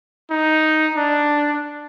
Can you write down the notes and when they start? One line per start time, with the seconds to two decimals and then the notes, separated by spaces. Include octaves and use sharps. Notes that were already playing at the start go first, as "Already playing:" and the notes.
0.30 D#4
0.95 D4